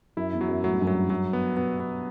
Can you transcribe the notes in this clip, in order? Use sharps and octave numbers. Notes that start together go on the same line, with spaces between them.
F#2 E4
E2
F#3
F#2
A2 F#3
G2
F#2
G2 F#3
F#3
B3
B2 B3
B3